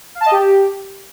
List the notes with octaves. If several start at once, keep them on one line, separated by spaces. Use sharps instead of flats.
F5
A5
D#5
G4